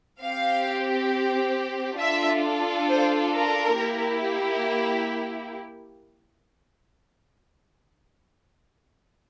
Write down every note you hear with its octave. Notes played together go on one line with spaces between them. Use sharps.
C4 G4 F5
D4 F4 A4 E5
C5
A#4
A#3 E4 G4